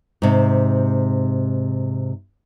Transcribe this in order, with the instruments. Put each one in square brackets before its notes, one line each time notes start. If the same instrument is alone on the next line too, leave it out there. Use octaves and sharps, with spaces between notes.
[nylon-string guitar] G#2 C3